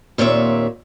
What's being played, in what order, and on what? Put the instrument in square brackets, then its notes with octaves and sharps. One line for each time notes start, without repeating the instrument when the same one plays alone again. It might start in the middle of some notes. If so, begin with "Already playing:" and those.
[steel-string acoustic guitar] D#2 A#2 C4 C#5 E5